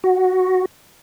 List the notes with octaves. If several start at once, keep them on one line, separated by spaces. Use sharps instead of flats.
F#4